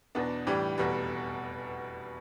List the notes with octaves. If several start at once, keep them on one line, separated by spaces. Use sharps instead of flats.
E2 B2 B3 D4
A2 E3 G3 D4 G4
F1 E2 B2 G3